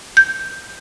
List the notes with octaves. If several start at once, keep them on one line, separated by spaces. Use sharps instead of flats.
G6